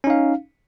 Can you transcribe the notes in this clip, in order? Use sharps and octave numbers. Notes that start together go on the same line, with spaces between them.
C#4 D#4 F5